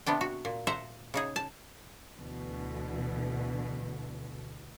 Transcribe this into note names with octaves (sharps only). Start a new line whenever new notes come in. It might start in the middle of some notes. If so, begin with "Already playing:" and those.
C3 B3 D4 G5
F#4
A#2
C5 E5 F#5 A#5
C#3 D#4 G#4
A5
D2 B2 D3 E3